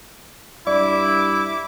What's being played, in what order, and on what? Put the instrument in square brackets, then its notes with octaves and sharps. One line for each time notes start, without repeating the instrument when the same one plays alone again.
[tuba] G2 [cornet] E4 [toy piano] D5 [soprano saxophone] D6